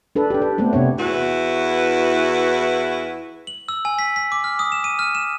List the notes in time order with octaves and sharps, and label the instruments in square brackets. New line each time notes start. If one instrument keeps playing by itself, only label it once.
[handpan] D4 A4 B4
D4 G4
B4
A3 B3 C4 G4
C3 B3 D4 C#5
[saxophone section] E2 E4 F#4 B4
[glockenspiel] F#7
E6
G#5
B6
B6
D6
F6
D#6
E7
D#7
F6
E7